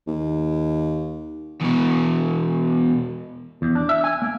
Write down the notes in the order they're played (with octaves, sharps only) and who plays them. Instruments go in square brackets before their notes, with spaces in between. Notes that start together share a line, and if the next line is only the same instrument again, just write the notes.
[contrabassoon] D#2
[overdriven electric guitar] E2 B2
[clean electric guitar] E2
D4
E5
G#5
A#3